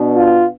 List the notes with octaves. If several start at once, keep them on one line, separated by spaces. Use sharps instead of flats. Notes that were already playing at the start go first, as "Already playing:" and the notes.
Already playing: B2 B3 D4
F4